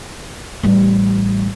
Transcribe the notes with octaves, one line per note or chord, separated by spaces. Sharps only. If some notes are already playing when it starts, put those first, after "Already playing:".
A1 G3